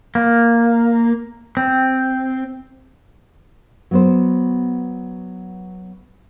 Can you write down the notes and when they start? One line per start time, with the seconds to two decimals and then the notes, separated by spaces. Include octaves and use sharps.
0.15 A#3
1.57 C4
3.91 F#3 B3 C5